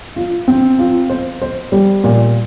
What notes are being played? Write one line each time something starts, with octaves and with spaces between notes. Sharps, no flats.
F4
C4
F4
C5
C5
G3
A#2